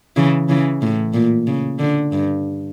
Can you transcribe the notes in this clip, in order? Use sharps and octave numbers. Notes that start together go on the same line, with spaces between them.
C#3 E3
C#3 E3
A2
A#2
C#3
D3
G2